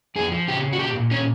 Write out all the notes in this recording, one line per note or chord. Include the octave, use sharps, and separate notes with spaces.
F2 G#4
F3
C#3 G4
C#3
F#4
A#2 G4
A#2
A#2 C#4